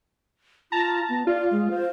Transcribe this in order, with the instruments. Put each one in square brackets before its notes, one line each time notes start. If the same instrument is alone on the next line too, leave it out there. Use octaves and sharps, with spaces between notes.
[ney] F4 [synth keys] A5 A#5
[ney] B3
[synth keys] F4 [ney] D5
[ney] G#3
C5